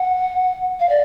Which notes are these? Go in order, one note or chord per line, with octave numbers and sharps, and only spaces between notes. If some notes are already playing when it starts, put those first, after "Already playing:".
Already playing: F#5
F5
D5